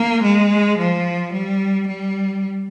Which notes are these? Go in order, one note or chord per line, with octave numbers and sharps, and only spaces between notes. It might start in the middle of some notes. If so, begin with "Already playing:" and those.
Already playing: A#3
G#3
F3
G3
G3